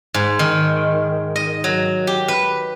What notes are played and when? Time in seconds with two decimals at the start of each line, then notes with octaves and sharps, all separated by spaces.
0.14 G#2
0.39 D#3
1.36 D#5
1.64 F#3
2.07 G4
2.28 B4